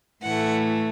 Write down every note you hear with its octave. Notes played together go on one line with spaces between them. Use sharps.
A2 E3 A3 F#5